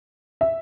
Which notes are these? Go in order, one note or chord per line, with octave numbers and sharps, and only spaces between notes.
E5